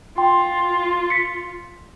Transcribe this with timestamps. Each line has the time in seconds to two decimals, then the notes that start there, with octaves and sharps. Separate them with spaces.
0.18 F4 G5 C6
1.10 B6 C#7